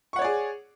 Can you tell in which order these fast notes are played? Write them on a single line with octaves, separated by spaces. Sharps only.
C#6 F#5 C#5 D5 G#4